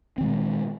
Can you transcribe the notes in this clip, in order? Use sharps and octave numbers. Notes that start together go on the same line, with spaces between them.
A#2 D#3 G#3 C4